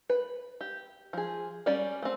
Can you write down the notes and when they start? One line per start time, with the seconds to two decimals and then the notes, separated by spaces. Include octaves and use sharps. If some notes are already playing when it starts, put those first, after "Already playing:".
0.10 B4
0.61 G4
1.13 F3 G#4
1.66 G3 C#4 D5
2.02 A3 C4